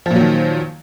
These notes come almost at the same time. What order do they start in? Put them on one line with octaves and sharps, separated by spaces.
F3 A#2 F#3 D#3